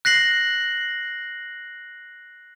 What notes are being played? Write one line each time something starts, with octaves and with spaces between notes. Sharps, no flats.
F#6 A#6 C7 F#7